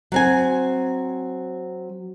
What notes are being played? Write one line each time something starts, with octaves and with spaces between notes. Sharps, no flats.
F#3 C4 G#5